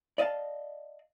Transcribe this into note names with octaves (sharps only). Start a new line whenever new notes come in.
D5 D#5 F5 F#5 A5